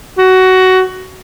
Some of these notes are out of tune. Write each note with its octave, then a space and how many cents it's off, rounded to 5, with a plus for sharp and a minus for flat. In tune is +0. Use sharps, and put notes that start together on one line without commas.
F#4 +15